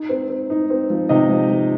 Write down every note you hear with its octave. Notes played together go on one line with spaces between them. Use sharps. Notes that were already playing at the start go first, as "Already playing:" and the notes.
Already playing: D#4
C4
C4
D#4
C4
F3
C3 D#4 D#5
F3
F3